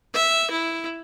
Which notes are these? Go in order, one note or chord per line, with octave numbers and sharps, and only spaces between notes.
E5
E4